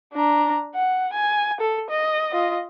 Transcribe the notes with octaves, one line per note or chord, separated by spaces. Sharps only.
D4 A#5
F#5
G#5
A4
D#5
F4 D#5